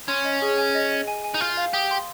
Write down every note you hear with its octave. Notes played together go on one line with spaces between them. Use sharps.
C#4 C6
D#5
G#4
G#5
D#5
D#5
G#5
G#5
D#4
F4 G6
F5
G4 D#6
C6